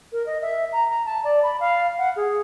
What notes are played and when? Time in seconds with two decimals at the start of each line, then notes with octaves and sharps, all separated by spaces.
0.12 A#4
0.26 D#5
0.42 E5
0.73 A#5
0.89 A#5
1.06 A5
1.24 D5
1.43 B5
1.60 F5
1.98 F#5
2.16 G#4